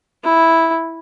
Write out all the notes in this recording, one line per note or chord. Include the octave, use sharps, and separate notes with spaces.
E4